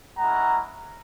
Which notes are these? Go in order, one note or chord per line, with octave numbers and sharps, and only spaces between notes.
G#3 C#4 E4 F#5 A#5